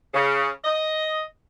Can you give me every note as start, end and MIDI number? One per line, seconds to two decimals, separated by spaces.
0.14 0.48 49
0.64 1.21 75